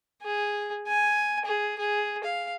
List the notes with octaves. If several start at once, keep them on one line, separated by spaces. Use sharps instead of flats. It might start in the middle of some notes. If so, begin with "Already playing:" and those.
G#4
G#5
G#4
G#4
F5